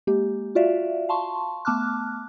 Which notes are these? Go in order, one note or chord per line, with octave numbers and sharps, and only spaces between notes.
G#3 A#3 G4
F4 F#4 D5 E5 F5
F5 A5 C6 C#6
A3 B3 A5 D6 F6 F#6